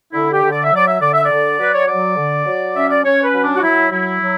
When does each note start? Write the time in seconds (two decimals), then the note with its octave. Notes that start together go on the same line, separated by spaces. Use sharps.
0.12 D3 E4
0.32 G4
0.41 D3
0.51 D5
0.64 E5
0.71 F#3 D5
0.87 E5
1.00 D3 D5
1.13 E5
1.24 D5
1.30 D3
1.58 F#3 B4
1.73 C#5
1.87 F#3 D5
2.16 D3
2.46 F#3
2.74 C#4 E5
2.90 D5
3.03 C#4 C#5
3.23 B4
3.32 F#3
3.42 D4
3.55 F#4
3.62 F#3 E4
3.90 F#3 E4
4.20 F#3